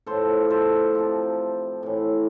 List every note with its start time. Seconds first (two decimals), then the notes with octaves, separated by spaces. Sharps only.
0.06 A2 F3 A4 C5
0.51 A4 C5
0.95 C3 F3
1.83 A2 E3